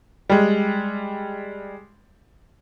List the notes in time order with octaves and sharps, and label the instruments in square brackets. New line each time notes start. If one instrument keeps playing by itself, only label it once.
[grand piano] G3 G#3